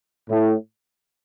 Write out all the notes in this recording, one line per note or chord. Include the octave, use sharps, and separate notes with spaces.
A2